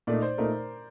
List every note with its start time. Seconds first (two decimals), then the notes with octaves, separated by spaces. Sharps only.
0.07 A#2 A3 D#4 D5
0.22 C5
0.38 A#2 A3 D#4 A#4